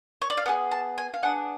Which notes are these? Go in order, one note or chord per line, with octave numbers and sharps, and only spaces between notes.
C#5
D5
F5
B3 D4 G#4 F#5
A5
G#5
F5
B3 D4 G#4 F#5